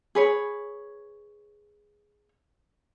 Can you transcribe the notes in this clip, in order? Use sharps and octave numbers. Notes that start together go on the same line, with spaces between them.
G#4 B4 C#5